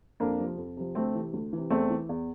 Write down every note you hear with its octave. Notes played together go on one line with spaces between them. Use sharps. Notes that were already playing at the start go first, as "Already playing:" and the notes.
F2 A#3 D4
C3 F3
F2
C3 F3
D2 A3 C4
C3 E3
D2
C3 E3
E2 A3 C4
E3
E2